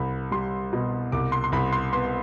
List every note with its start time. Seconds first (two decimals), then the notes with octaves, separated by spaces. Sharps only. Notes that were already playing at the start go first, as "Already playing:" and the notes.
Already playing: C2 B5
0.32 G3 C6
0.73 B2
1.12 C2 D6
1.32 C6
1.44 C6
1.52 C2 B5
1.73 C6
1.93 B3 C6